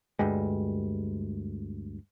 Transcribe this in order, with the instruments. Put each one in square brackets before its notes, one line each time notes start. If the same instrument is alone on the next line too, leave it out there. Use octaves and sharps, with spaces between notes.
[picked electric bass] D2 G2 G3 G#3